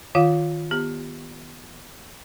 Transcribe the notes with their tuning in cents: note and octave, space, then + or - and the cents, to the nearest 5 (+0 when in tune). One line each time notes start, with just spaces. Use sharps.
D#3 +0 F4 +0 F5 +10
B3 -15 G4 +0